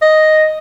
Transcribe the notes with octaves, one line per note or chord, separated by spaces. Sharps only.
D#5